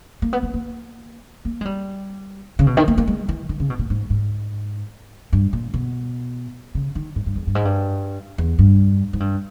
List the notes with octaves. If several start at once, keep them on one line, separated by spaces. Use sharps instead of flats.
A#3
B3
B3
A#3
A#3
G#3
G3
C#3
B2
D#3
A#3
A#3
G#3
E3
D#3
C#3
B2
A#2
G#2
G#2
G2
A#2
B2
C#3
D#3
G#2
G2
E2
G2
G#2
G2
E2
G2
G#2
G2